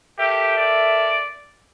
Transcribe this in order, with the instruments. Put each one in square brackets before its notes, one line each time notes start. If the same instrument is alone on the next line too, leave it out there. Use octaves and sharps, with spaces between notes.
[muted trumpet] G4 [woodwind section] A4 A#4 E5
[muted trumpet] D5